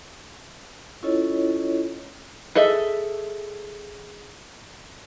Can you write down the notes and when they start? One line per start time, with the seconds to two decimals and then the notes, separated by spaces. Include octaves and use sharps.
1.03 C#4 E4 F4 A4 C#5 D#5
2.55 G#4 A4 D#5 E5